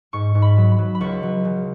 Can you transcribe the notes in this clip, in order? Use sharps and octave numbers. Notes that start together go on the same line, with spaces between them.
G#2 C#6
G#2
B5
F#3
B5
F#3
B5
C#2 C#6
F#3
C#3